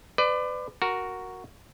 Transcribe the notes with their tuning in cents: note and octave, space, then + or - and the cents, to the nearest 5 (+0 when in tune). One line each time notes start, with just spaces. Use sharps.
B4 +30 D5 +20
F#4 +0 A#4 +0